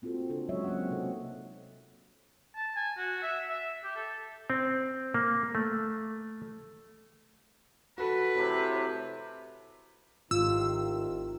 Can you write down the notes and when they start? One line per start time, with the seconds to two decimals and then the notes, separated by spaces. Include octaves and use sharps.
0.02 A#3 C4 F4 F#4 A4
0.29 C#3 C4 D4 A4
0.49 F#3 G#3 C#4 C#5 D#5 E5
0.64 A#3 C4 F#4 E5 F#5
0.91 C3 C4 D#4 A4 D#5
2.56 A5
2.76 G#5
2.98 F#4
3.23 E5
3.49 E5
3.84 G4
3.96 A4
4.50 C4
5.14 A#3
5.55 A3
7.98 F#4 A4 B4
8.36 A2 C3
10.31 G#1 A2 C3 D#3 F4 E6